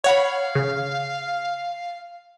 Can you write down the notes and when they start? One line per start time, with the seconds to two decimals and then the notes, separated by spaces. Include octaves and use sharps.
0.04 C#5 F5 F#5 B5
0.55 C#3